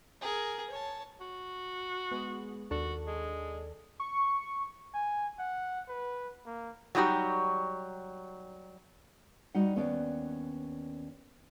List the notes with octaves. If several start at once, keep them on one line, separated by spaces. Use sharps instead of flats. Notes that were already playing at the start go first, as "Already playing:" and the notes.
G#4 A#4
C#5 A5
F#4
G#3 B3
D#2 D4 F#4 A4
G#3
C#6
G#5
F#5
B4
A#3
F#3 G3 D#4 F#4 G4
G3 D#4 F#4 F#5
D#2 B3 C#4 D4 D5